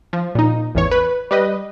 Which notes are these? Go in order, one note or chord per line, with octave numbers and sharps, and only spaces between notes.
F3
A#2 D#4
A1 E2 C#5
B4
G3 B4 D#5